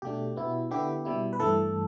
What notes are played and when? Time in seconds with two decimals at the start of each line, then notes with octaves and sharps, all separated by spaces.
0.02 B2 A3 D4 G4
0.36 B2 B3 E4
0.71 D3 B3 E4 G4
1.05 B2 G3 E4
1.33 B4
1.40 G2 E3 A3 A4